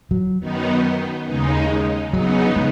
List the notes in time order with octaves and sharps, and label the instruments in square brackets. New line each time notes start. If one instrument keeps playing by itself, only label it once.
[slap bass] F#3
[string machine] F#2 D#3 B3 D#4
D#2 C#3 G#3 D#4
[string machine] C#3 B3 D#4 [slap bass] F#3
[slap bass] G#3